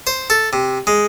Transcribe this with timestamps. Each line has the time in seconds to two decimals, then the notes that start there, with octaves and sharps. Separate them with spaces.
0.07 C5
0.30 A4
0.53 C3
0.87 G#3